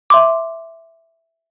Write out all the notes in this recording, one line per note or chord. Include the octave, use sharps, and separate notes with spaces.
E5 C6 D6